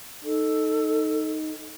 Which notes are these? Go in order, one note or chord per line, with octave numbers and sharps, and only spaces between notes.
D#4 A4